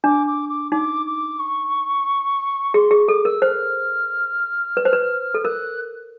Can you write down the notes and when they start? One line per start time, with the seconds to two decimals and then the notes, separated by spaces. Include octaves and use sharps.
0.04 D4 D6
0.27 D6
0.49 D6
0.71 D#4 D6
1.06 D6
1.39 C#6
2.74 G#4 C6
2.91 G#4 C#6
3.08 A4 D6
3.25 A#4 E6
3.42 C5 F6
4.77 B4
4.85 C5
4.93 B4
5.34 A4
5.44 A#4 F#6